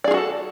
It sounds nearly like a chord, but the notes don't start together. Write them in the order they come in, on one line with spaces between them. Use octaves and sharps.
D5 G#4 F4 F#4 A4